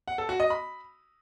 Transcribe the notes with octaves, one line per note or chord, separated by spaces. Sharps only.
F#5
A4
F#4
D#5
B5